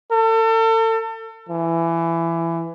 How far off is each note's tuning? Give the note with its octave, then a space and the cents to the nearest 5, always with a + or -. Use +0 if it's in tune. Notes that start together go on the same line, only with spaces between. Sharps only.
A4 +35
E3 +20